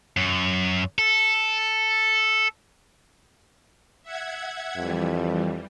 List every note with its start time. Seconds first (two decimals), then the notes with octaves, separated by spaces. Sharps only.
0.17 F#2
0.98 A4
4.03 E5 F#5 G#6
4.77 F2 E3 G3